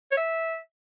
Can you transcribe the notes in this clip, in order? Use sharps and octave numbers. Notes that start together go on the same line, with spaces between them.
C#5
E5